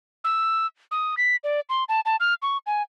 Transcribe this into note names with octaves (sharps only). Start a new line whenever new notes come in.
E6
D#6
B6
D5
C6
A5
A5
F6
C#6
G#5